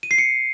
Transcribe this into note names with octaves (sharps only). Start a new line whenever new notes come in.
D#7
C7
C#7